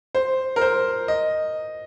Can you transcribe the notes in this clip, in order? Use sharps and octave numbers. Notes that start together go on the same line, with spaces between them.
C5
A#4
C5
D#5